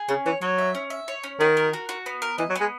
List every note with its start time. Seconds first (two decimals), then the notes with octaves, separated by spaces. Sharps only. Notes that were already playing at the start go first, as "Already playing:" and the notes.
Already playing: G#4
0.09 C#3 C#4
0.26 E3 C#5
0.41 F#3 C#5
0.58 E5
0.75 C#4
0.90 E5
1.08 C#5
1.24 C#4
1.40 D#3 F#4
1.57 A#4
1.73 F#4
1.89 F#4
2.06 B3
2.22 A#4
2.38 E3 D#5
2.49 F#3
2.56 B3
2.61 G#3